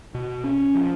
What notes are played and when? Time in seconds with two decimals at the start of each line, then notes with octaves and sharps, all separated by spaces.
0.14 B2
0.44 C#4
0.75 F3